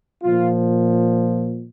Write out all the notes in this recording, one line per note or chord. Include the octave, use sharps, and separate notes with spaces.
A#2 F3 F4